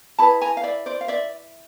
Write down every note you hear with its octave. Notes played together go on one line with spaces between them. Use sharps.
E4 G#4 B4 A5 B5
G#5 A#5
F5
D5 E5
C5 D5
F5
D5 E5